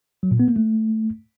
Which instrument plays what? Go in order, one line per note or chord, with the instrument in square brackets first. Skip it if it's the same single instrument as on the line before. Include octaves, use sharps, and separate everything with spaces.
[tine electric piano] F#3
A#2
B3
A#3
A3